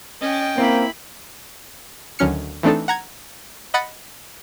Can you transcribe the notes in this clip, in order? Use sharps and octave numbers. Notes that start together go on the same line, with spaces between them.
C#4 D#5 G5
A#3 C4 E4 B5
D2 D#3 F#3 C#4 F6 C#7
E3 A3 C4 D4 D#4 A4
F#5 A#5 G#6
D#5 F#5 B5 F#6 A6 C#7